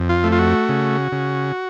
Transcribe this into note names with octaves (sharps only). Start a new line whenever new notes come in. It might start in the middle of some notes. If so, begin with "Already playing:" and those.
Already playing: F2
F4
A3
F4
F#4
C#3
C#3